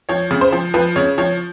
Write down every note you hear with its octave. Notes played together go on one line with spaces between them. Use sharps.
F3 C#5
C#3
C5
F3
F3 B4
C#3 C#5
F3 C#5